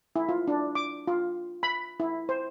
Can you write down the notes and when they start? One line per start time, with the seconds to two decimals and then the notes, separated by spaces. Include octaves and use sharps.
0.16 E4
0.29 F4
0.48 D4
0.75 D6
1.07 F4
1.63 B5
2.00 E4
2.29 C5